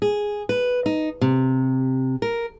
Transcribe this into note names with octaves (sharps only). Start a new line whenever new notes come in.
G#4
B4
D#4
C3
A#4